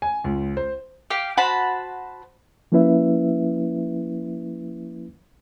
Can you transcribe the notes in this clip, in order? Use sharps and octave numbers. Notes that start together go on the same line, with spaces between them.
G#5
C#2
C5
G4 F5
F#4 C5 A5 B5
F3 A#3 C#4 E4 B4 E5